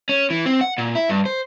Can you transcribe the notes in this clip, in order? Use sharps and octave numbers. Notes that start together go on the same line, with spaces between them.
C#4
E3
C4
F#5
A#2
E4
G2
C5